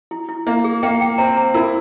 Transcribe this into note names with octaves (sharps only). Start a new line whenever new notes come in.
E4
E4
A#3 E4
G#4
A#3 G5
G5
C4 A#5
A#5
E4 A#4